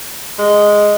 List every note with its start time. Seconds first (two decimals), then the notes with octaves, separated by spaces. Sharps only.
0.39 G#3